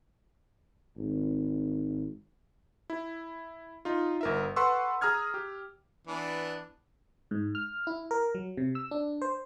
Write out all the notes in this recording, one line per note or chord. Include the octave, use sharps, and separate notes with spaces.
G#1
E4
D#4 F4
G1 A#4 E5
A4 B4 F#5 C6 C#6 E6
G#4 A#5 D#6 F6 G#6
G4
E3 B3 D4
G#2
F6
E4
A#4
F#3
C3
E6
D4
C5